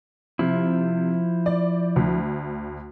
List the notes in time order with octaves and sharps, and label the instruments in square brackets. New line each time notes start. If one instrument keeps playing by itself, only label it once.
[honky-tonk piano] C3 [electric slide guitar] F3 E4
[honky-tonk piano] D5
D2